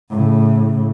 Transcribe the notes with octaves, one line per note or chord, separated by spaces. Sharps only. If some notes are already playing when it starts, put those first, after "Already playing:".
A2 C#3